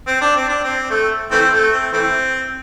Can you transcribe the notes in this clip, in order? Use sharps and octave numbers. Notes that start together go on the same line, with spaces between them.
C4
D4
C4
D4
C4
A3
E3 A3 C4
A3
C4
E3 A3 C4